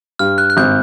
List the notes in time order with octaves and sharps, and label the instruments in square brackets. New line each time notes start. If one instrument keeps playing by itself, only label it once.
[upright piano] G2 [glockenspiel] F6
[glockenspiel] F#6
F#6
[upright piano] G#1 [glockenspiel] G6